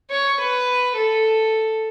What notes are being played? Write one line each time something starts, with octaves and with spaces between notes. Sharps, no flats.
C#5
B4
A4